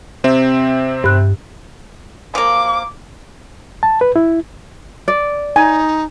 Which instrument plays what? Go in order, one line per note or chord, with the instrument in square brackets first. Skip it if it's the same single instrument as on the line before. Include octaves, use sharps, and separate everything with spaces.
[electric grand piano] C3 C4 E5
[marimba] G2 F#6
[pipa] F3 A#3 [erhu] D6
[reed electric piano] A5
B4
E4
[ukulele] D5
[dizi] D#4 [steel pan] G#5